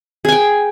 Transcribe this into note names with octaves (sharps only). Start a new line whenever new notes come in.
G#4 G5 G#5